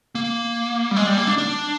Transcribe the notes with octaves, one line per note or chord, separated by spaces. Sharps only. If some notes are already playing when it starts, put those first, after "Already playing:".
A#3
G3
G#3
G3
A#3
D4
D4